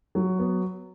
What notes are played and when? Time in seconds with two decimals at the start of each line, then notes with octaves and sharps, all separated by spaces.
0.15 F#3
0.39 B3